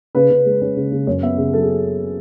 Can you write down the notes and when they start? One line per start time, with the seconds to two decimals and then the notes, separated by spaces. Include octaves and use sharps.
0.15 C#3 B4
0.30 C#3
0.46 G#3
0.62 C#4
0.77 C#3
0.92 C#3
1.07 F#2 C#5
1.22 B3 E5
1.37 C#3 G#4
1.53 F#3 A4
1.62 G#4